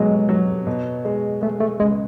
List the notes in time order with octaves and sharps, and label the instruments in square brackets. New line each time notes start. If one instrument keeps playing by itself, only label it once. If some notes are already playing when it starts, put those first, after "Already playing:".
Already playing: [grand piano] B2 F#3 [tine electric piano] G#3
[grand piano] F#3
B2
G#3
[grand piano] G#3 [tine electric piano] A3
[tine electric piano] A3
[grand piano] C#2 [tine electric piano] G#3